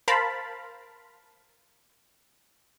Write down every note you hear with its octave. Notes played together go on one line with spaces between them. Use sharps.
A#4 C5 F5 A5 B5